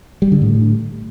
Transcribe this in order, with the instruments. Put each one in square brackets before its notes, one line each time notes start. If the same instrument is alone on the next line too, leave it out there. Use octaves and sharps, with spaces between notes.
[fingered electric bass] G3
D3
A2